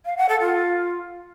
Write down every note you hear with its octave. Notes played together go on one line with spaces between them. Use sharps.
F5
F#5
A4
F4